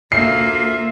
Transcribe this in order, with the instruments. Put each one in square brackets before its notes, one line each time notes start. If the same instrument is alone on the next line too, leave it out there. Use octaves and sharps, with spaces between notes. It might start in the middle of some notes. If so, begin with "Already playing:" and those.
[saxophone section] D2 F4 E5 [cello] A#3 [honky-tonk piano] C7